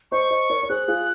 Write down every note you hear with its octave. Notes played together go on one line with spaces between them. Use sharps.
C5 D#5 C#6
C5 D#5
A#4 C#5
C#5
G#4 C5 F#6
F4 G#4